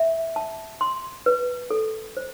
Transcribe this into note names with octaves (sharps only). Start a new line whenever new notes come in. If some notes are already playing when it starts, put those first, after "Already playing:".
Already playing: E5
A5
C6
B4
A4
C5